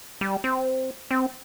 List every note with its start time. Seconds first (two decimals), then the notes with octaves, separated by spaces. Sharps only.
0.21 G3
0.44 C4
1.11 C4